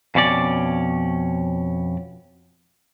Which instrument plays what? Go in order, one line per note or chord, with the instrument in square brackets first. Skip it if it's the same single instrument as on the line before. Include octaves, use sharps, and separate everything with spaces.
[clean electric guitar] F2 B2 C#4 D5